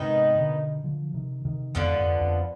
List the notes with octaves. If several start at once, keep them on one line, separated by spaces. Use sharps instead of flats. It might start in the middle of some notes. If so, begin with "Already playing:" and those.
Already playing: G#2 C3 D#3 B3 D#4
B2 D3
D3 F3
C3 D#3
C3 D#3
F2 G#2 D3 F3 B3
F2
F2